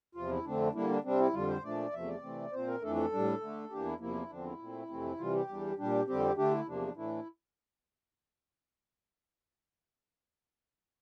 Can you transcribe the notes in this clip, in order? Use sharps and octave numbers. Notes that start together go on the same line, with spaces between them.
E2 C3 F3 F4
E4
F2 D3 A3 C4 D4
D3 G3 A#3 D4 E4
D4
C3 G3 C4 D4
E4
F2 D3 G3 F4
C5
A#2 F3 A3 D4 D5
E2 C3 F3 A3 E5
D5
C3 E3 A3 C4
A#2 F3 C4 C5
A#4
F2 E3 A3 D4 A4
A4
A2 G3 D4
D3 A3 D4
E2 E3 A#3 D4 G4
E4
E2 C3 F3 A#3 E4
E2 D3 F3 C4 D4
E4
A#2 A3 C4
F2 C3 E3 A3 C4
C3 E3 G3 F4
G4
E2 E3 G3 D4
A#2 G3 D4 G4
F2 D3 G3 C4 G4
D3 A3 D4 G4
E4
E2 C3 F3 A#3 D4
A2 E3 A3 D4 E4